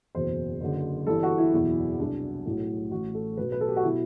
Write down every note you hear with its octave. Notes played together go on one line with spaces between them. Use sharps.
F#1 E2 B2 C5
F#1 F#2 D3
G1 G2 E3 A4
F#4
E4
F#1 E2 B2 F#3
C2 B2 F#3 D4
B1 A2 F#3 E4
A1 A2 F#3 F#4
A4
B1 B2 F#3 B4
B4
A4
G4
F#4
B2 F#3 E4